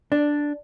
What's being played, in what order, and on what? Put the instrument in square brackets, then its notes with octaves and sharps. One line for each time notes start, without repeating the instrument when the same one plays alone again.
[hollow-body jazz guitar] D4